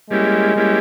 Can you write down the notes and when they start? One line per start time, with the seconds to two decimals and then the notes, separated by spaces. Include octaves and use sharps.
0.10 G3 G#3 A#3 C#4 E4 G4
0.56 G3 A#3 C#4 E4 G4